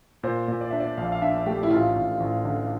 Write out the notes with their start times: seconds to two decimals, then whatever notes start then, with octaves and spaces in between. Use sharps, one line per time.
0.23 A#2 C5
0.48 A#2
0.61 D5
0.70 D4 E5
0.80 D5
0.97 A#1 F5
1.12 F5
1.22 D4 E5
1.46 A3 G4
1.63 E4
1.70 A1 F4
1.96 A1
2.20 A1
2.45 D3